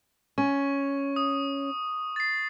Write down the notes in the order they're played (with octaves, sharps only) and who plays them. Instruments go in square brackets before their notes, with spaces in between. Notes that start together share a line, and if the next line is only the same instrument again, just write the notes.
[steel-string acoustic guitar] C#4 [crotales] C#6
[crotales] D#6
A6 C7